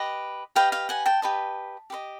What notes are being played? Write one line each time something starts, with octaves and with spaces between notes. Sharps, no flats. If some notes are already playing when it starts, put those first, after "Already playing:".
Already playing: G4 B4 D#5
G4 B4 D#5 F5 G5
F5 G5
F#5 G#5
G5 A5
G4 B4 D#5
G4 B4 D#5